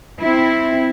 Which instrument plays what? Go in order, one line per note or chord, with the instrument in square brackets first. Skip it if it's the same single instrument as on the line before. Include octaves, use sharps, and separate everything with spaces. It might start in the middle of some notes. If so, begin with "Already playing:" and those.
[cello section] C4 E4